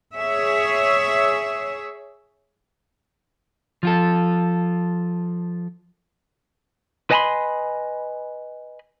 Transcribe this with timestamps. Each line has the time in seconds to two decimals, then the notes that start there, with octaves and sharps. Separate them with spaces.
0.16 G#4 C#5 E5
3.83 F3 F4 A4
7.11 B4 D#5 G#5 A5 B5 C6